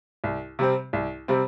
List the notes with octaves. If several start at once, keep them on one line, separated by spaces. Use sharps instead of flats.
C2
C3 G3 C4
C2
C3 G3 C4